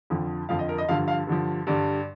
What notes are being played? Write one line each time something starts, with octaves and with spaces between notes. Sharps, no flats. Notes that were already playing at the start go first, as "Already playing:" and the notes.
F2 D3 F3
F2 D3 F3 F5
D#5
A#4
D#5
G2 D3 F3 F5
F5
G2 D3 F3
G2 D3 G3 D5